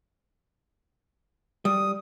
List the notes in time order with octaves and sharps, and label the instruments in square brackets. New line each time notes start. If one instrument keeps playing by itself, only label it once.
[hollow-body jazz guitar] G3 [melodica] D#6